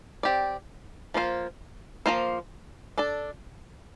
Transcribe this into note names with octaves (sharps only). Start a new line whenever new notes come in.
C4 G4 D5
F3 A#3 F4 C5
F3 A#3 F4 C5
D4 A4 D5